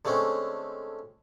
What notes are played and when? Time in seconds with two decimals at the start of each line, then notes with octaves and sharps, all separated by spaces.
0.05 D3 G#3 A3 C4 C#4